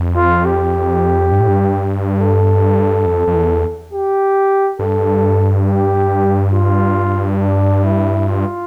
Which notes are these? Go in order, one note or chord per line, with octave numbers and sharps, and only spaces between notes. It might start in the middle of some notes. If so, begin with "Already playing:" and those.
Already playing: F2
F4
G4
G2
A2
G2
A4
F2
F2
E2
G4
G2 A4
G4
F4
D4
E4
F4